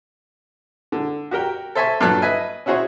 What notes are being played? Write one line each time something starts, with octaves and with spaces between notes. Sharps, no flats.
D3
F#4 G4 A#4 G5
A4 C5 E5 G#5 A5 C#6
G2 A#2 F#3 A4 A5 F#6
B4 D#5 E5 G#5
C#4 E4 F#4 G#4 C5 C#5